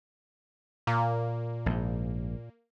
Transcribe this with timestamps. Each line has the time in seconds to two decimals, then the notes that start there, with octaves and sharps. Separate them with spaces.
0.87 A#2 A#3
1.66 A#1 G#2